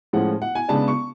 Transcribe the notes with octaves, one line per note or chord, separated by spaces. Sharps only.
A2 F3 G#3 C#4 F#5
F#5
G#5
C#3 G#3 B3 D4 A5
C#6